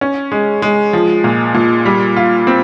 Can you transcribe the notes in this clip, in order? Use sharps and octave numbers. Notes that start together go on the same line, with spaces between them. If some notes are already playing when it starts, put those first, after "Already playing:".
C#4
G#3
G#3
F3
A#2
A#2
G3
F4
C4